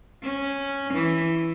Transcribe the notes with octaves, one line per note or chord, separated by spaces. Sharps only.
C#4
E3